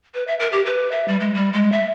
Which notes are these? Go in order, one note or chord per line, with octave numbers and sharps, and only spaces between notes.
B4
E5
A#4
G4
B4
E5
G3
G#3
G3
G#3
E5